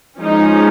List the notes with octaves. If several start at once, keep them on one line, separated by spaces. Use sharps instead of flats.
F3 G#3 C#4 D#4